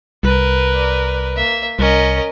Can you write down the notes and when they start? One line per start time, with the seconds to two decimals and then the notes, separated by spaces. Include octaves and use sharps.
0.23 C2 A#4 B4
0.75 D5
1.36 A#3 E5
1.79 C2 C#4 A#4 D#5